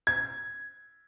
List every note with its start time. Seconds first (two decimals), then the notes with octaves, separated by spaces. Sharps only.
0.07 G#6